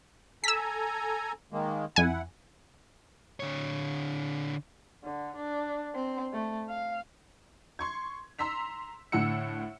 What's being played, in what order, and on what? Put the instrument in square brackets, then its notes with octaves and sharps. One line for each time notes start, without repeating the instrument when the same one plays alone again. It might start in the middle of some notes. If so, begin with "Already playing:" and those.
[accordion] A4 G#5 A#5 [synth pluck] E6 B6
[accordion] D#3 G#3 A#3
[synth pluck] F2 G#5 [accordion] E4 F#5
[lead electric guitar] D3 C#5
[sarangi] D3
D4
C4
A3
F5
[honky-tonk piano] C6 C#6 G#6
A#5 C6 E6 B6 F7
A2 D3 F#5 E6 C#7